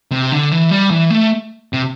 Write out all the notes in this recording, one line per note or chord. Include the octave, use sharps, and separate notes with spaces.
C3
D3
E3
G3
E3
A3
C3